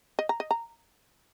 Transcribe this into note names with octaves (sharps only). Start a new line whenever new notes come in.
D#5
A#5
D#5
A#5